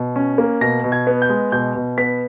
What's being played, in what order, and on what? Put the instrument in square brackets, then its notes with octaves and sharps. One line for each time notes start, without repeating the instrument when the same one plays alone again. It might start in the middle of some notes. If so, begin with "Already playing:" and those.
Already playing: [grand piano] B2
C#4
A#3
B2 A#6
B2
G#6
B3
G6
G#3
B2 G6
B2
B3 B6